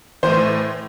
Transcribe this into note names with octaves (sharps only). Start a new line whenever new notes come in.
A2 E3 C5